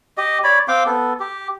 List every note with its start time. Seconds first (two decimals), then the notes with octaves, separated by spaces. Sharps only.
0.18 G4 D#5
0.44 C#5 D5 B5
0.68 C4 F5 G5 D6
0.86 B3 A4
1.20 G4